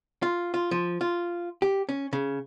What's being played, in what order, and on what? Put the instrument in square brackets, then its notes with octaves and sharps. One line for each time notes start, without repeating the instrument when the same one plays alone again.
[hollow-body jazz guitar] F4
F4
F3
F4
G4
C#4
C#3